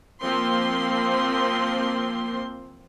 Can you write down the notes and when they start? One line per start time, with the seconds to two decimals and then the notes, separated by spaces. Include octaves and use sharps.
0.22 F3 A#3 C4 C6